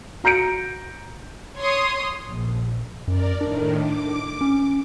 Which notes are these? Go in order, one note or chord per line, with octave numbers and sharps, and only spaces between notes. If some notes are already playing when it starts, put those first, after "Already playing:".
F#4 A#5 G6 C#7 D7
C#5 C6 D#6
A#1
F#2 A#4 D5
A2 D#3 D4
D6
C#4